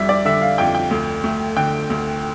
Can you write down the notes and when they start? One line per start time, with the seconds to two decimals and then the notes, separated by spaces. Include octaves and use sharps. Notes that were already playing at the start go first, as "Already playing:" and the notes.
Already playing: F2 G3 E5
0.09 D5
0.25 D3 E5
0.42 F5
0.58 F2 G5
0.75 G5
0.91 D2
1.24 A3
1.57 D3 G5
1.90 D2